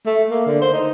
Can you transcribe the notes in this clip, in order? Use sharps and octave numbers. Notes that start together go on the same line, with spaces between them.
A3
A#3
D3
C5
D#4